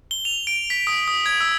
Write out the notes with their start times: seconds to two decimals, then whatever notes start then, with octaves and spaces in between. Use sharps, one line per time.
0.11 G7
0.25 F7
0.47 D7
0.70 B6
0.87 D#6
1.08 D#6
1.26 G#6
1.41 E6